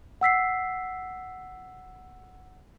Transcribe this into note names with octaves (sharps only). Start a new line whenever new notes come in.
F#5 E6 B6 C7